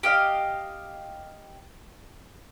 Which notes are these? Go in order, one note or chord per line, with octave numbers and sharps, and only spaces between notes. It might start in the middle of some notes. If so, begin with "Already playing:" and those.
G4 D#5 F5